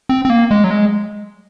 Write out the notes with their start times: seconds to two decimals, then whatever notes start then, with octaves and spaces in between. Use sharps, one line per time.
0.09 C4
0.25 C4
0.30 A#3
0.51 G#3
0.64 F#3
0.71 G#3